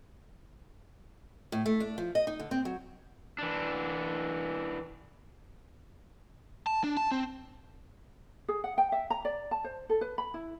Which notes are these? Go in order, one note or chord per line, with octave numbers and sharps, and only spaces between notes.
A2
A3
D4
F3
D#5
D#4
D3
C4
F#3
E3 D4
A5
D4
A5
C4
G#4
F#5
G5
E5
A#5
D5
A5
C5
A4
B4
B5
E4